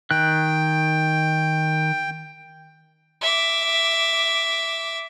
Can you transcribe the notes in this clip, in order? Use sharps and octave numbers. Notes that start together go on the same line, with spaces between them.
D#3 G5 F#6
E5 D6